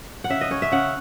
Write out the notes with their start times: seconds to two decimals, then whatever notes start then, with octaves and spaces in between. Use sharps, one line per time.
0.24 F#5
0.30 C#3 E5
0.41 D#5
0.51 C#4 C#5
0.62 E5
0.71 C#3 F#5